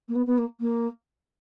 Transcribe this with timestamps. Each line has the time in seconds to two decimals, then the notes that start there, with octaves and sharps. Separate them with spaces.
0.08 A#3
0.15 B3
0.26 B3
0.38 A#3
0.60 A#3